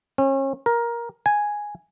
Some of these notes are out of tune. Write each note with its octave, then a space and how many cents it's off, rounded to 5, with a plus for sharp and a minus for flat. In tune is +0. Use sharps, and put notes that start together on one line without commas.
C#4 -35
A#4 +15
G#5 +0